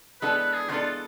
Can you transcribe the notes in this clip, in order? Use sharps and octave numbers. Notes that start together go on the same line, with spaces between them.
E3 G#3 B3 D4 A4 B4
B4
G#4
E3 G#3 B3 D4 F4 A4